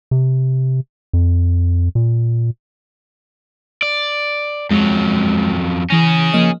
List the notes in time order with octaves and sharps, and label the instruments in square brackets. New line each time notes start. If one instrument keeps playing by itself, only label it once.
[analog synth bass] C3
F2
A#2
[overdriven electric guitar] D5
[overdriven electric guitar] F2 F#3 [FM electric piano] G#3
[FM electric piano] E3 A#6 [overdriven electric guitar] C#4 G#4
[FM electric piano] F3 A#3 D#5